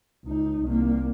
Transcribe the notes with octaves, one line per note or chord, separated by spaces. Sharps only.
C#2 D#4
C2 A#3